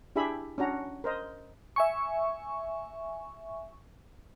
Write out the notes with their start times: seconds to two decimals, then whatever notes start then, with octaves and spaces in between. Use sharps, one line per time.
0.16 D4 E4 G4 G#4 E5 B5
0.58 C#4 D4 F#4 A#5
1.04 A#4 C5 D#5
1.76 E5 G#5 C#6